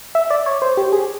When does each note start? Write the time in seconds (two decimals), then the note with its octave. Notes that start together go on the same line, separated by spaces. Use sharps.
0.15 E5
0.30 D5
0.46 C#5
0.62 C5
0.77 G4
0.92 G#4